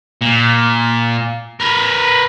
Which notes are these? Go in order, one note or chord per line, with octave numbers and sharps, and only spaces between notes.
A#2
A#4 B4